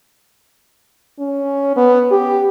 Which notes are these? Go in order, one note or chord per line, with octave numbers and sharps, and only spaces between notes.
C#4
B3
G4